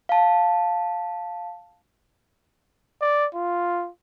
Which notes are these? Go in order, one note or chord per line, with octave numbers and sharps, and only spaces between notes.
F5 A5
D5
F4